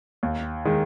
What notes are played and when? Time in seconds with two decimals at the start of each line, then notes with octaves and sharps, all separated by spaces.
0.23 D#2
0.65 D#3 G#3